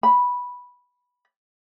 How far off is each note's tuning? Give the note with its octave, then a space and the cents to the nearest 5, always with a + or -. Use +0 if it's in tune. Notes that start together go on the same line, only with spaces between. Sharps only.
B5 -5